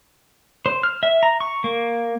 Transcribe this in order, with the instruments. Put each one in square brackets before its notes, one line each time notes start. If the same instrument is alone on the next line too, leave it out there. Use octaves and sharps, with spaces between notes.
[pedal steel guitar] C5
F6
E5
A#5
C#6
A#3